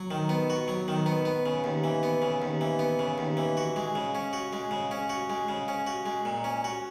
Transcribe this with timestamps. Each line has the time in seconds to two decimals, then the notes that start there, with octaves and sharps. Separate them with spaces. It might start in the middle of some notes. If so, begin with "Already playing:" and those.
Already playing: F#3
0.11 D#3
0.29 B3
0.50 F#4
0.68 F#3
0.88 D#3
1.06 B3
1.25 B3
1.46 C#3
1.64 D#2
1.84 E3
2.03 B3
2.22 C#3
2.42 D#2
2.61 E3
2.79 B3
2.99 C#3
3.18 D#2
3.37 E3
3.57 F#4
3.76 G#3
3.95 C#3
4.15 C#4
4.33 F#4
4.53 G#3
4.71 C#3
4.91 C#4
5.10 F#4
5.30 G#3
5.49 C#3
5.68 C#4
5.87 F#4
6.06 G#3
6.25 A#2
6.44 C#4
6.64 F#4